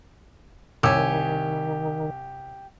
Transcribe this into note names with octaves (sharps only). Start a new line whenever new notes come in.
C2 D#3 G4 C#5 G#5 E6